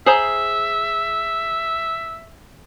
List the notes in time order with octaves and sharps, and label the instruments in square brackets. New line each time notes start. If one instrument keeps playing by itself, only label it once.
[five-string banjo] G#4 C5 A#5 [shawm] E5